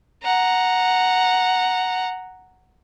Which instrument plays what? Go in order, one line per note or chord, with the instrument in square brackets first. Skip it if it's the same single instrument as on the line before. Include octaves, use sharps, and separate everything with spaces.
[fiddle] F#5 A#5